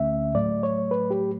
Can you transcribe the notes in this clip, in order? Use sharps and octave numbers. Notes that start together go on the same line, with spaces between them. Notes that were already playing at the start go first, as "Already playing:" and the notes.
Already playing: D2 D3 A3 C#4 E5
A2 F#3 A3 D5
C#5
B4
G4